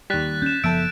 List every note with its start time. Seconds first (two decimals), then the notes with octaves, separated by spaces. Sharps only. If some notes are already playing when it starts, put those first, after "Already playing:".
0.10 D#2 G3 F#6 A6 B6
0.42 C#4 G6 E7
0.64 F#1 F3 B3 A4 E5 D7